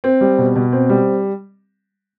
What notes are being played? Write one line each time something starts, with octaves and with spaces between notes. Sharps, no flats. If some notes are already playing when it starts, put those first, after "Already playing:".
C4
G3
B2
B2
C4
G3